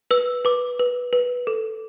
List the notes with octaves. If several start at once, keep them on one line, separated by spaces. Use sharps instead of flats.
B4 E6
B4 D6
B4
B4
A4